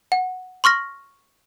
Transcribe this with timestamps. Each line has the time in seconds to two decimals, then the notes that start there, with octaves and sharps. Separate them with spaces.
0.12 F#5
0.64 C6 C#6 F6 A#6